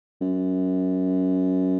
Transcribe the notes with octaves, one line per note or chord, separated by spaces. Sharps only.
F#2